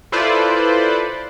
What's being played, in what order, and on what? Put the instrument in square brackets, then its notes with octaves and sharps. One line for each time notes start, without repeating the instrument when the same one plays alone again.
[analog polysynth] E4 F4 A4 B4 C5 D5